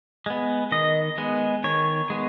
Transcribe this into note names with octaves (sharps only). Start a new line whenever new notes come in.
G#3 B3
D#3 D#5
G#3 B3
D#3 C#5
G#3 B3